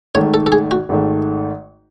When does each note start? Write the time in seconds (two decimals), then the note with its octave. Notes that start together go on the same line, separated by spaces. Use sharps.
0.15 G#1 G#2 D#3 A3 C#5
0.34 A4
0.46 A4
0.52 G#4
0.71 F#4
0.89 G#1 G#2 D#3 A3